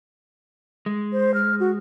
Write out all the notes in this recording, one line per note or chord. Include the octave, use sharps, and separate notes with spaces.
G#3
C5
F6
F#4